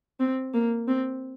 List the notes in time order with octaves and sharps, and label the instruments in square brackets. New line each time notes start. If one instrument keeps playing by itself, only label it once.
[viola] C4
A#3
C4